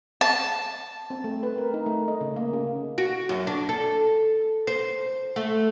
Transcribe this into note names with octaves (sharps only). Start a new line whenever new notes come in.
A5
C4
A3
B4
A#4
D#4
A3
D#5
C#3
A#3
C#3
F#4
F#2
D4
A4
C5
A3